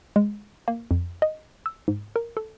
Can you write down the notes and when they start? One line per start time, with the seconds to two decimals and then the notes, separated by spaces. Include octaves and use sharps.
0.16 G#3
0.68 A#3
0.91 F2
1.22 D#5
1.66 E6
1.88 G#2
2.16 A#4
2.37 A4